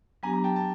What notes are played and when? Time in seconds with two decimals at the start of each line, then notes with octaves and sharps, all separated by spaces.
0.23 F#3 B3 D4 G4 G#5 A#5
0.33 A#5
0.44 G5 A5
0.56 A5